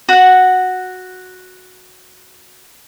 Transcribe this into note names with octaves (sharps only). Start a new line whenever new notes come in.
F#4 F#5